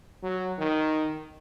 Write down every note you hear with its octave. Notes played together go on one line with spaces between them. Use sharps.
F#3
D#3